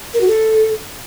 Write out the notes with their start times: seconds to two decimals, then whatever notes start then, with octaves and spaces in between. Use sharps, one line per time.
0.14 A#4
0.21 F#4
0.28 A4